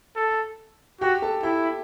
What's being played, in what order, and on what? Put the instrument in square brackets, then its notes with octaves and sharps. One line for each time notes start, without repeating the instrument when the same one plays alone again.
[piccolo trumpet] A4
[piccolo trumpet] F#4 [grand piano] G4 G5
[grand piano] A4 A5
[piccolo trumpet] E4 [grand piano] G4 G5